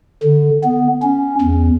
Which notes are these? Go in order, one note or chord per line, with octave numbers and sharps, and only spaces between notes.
D3
B3
C#4
E2